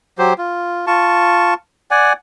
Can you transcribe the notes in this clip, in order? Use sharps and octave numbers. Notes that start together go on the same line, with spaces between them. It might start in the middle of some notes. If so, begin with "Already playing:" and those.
F#3 G4 C5
F4
F4 A5 C#6
D5 F#5 G#5